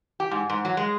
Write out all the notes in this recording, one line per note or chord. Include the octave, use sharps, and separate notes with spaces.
G4
G#2
G#2
F#3
G#3